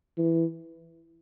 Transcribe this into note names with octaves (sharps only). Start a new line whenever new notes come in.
E3